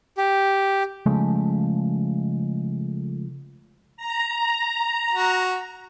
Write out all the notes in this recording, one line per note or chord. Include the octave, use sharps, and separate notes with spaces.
G4
C#3 F3 G#3 A3
A#5
F#4